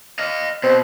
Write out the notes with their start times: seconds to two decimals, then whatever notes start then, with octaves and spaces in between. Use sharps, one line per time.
0.19 D#5 F5
0.63 B2 C4